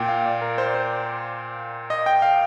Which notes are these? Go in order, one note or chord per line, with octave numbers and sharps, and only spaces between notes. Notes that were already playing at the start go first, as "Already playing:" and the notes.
Already playing: A#2 G5
F5
D5
A#4
C5
D5
C5
D#5
G5
F5